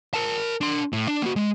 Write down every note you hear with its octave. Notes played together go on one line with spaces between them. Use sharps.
A#4 A5
D4 C6
A2
D4
A#3 F#4
G#3